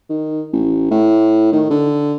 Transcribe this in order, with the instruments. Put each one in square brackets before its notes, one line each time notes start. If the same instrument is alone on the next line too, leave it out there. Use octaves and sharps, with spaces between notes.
[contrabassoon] D#3
A1
A2
D#3
D3